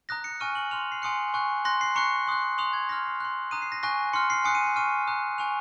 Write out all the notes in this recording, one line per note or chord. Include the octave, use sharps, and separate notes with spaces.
A#5 D#6 F#6 A#6
C#7
G#5 C#6 F6 D#7
F#7
C6 F6 F7
C7
G#5 C6 D#6 F#6 C#7
G#5 C#6 F#6
C6 F#6 A#6
C7
A#5 C#6 F#6 C#7
C6 D#6 F#6
C6 D#6 F#6 F7
G#6
C6 F6 A#6
C7
C6 F#6
A#5 D#6 F#6 D#7
C7
A#6
G#5 C#6 F#6 A#6
C6 F6 C#7
C7
G#5 D#6 F#6 C#7
D#7
C#7
G#5 C#6 F6 D#7
A#5 D#6 F#6
G#5 C#6 F#6 F7